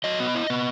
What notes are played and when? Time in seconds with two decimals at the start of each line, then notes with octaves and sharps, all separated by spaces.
0.04 F#3 D#5
0.20 B3
0.35 E4
0.50 B3